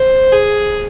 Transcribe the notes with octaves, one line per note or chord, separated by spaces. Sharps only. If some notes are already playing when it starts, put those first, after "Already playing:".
Already playing: C5
G#4